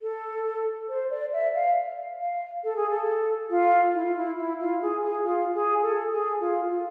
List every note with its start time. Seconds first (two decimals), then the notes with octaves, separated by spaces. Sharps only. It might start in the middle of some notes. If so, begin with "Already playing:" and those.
0.02 A4
0.89 C5
1.10 D5
1.33 E5
1.55 F5
2.20 F5
2.64 A4
2.76 G#4
2.90 A4
3.50 F4
3.94 E4
4.06 F4
4.16 E4
4.38 E4
4.60 F4
4.82 G#4
5.03 G#4
5.25 F4
5.54 G#4
5.83 A4
6.13 G#4
6.41 F4
6.70 F4